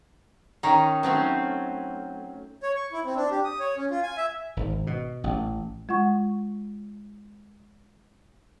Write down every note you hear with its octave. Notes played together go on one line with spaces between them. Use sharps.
D#3 C#4 D#4
F#3 A3 C4 C#4
C#5
C#6
E4
C4
D4
G4
D#6
C#5
C#4
F4
G#5
E5
G#1
B2
A1
G#3 F4 F#5 C#6